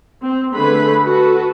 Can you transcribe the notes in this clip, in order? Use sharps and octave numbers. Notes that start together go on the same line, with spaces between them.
C4
D3 A3 G#4 B4 B5
F#4 A4 B4